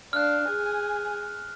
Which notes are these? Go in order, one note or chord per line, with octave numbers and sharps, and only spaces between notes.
D4 F5 F6 F#6
G#4 G#5